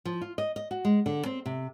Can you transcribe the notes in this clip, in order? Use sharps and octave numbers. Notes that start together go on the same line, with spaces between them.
F3
F4
D#5
D#5
F#4
G#3
D3
C4
C3